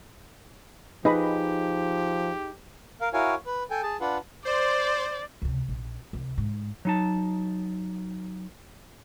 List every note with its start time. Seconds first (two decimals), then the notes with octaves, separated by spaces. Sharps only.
1.05 F3 D#4 G4 G#4 B4 D#5 B5
3.01 A#4 F5
3.13 E4 F#4 A#4 C#5 F5 G#5
3.46 B4
3.70 A4 G5 G#5
3.83 G#4 A5
4.01 D4 F4 B4 F#5
4.45 C5 D5
5.42 C#2 C3
5.68 A#1
6.13 C2
6.38 G#2
6.85 F#3 D#4 A5